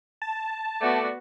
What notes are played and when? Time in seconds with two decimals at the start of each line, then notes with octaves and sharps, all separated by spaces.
0.22 A5
0.81 A3 B3 F#4 D5